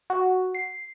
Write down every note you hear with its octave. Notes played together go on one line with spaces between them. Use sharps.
F#4
C7